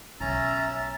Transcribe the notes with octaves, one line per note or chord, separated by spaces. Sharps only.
B1 C#4 E5 A#5 A6